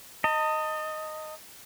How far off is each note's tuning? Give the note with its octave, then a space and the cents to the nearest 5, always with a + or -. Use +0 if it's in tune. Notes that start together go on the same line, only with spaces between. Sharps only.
D#5 +0 A5 +45